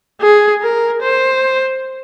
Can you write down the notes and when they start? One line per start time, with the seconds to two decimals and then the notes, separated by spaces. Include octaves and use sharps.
0.21 G#4
0.62 A#4
1.02 C5